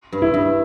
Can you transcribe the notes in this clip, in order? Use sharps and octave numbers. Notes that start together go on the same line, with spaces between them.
G2
E4
G2